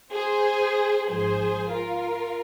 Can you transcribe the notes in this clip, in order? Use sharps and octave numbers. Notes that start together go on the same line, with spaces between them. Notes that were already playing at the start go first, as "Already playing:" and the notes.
G#4 C5
G#1 G#2 F3 G#4 C5
F4 A#4